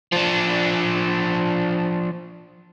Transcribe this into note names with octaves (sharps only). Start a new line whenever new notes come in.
F3 D4